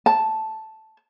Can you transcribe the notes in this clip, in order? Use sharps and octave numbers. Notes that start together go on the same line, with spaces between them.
A5